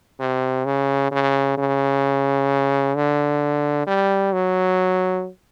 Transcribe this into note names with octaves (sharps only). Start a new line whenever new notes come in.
C3
C#3
C#3
C#3
D3
G3
F#3